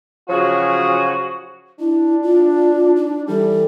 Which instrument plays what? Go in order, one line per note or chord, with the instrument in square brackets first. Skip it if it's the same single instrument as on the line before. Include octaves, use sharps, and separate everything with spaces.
[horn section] C#3 F#3 G#4 [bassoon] F3 [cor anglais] F#4
[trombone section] D4 [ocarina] E4
[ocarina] F4
D#4
[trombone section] E3 G3 [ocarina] A4